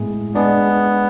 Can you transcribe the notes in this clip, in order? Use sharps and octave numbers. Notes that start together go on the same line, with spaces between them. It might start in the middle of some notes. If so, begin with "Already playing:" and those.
Already playing: A2 G#3 B3 E4 G#4
G#3 B3 D4 G#4 D5